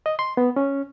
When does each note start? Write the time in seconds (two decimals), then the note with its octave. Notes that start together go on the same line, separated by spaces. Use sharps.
0.06 D#5
0.19 C6
0.37 B3
0.56 C#4